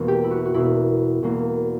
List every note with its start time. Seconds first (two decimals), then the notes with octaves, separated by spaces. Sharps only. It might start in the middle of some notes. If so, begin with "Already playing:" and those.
Already playing: E1 E2 B2 A#3
0.08 G4
0.24 E4
0.31 F#4
0.45 F#4
0.54 E1 E2 B2 A#3 E4
1.22 E1 E2 B2 A#3